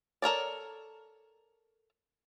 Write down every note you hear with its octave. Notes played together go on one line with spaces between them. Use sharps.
A4 A#4 C#5 D5